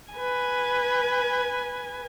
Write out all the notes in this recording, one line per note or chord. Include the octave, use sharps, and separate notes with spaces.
B4 G#5